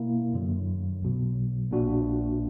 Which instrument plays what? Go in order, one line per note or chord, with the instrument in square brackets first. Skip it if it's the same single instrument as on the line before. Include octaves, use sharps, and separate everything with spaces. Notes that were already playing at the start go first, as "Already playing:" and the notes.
Already playing: [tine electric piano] B2 A#3 E4
F#2 D3 F#3
B1 B2 F#3
A#1 A#2 A#3 D4 F#4